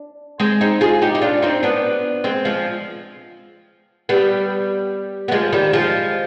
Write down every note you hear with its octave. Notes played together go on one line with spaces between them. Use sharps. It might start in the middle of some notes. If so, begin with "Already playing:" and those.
Already playing: D4
G#3 C4
C4 D#4
F4 G#4
D#4 G4
D#4
D4 F4
C4 D#4
B3 D4
G#3 C4
F3 G#3
G3 B3
B3
F3 G#3
D#3 G3
F3 G#3